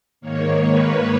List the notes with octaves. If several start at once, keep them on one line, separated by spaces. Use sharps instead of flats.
G#2 D#3 A#3 C#5
B4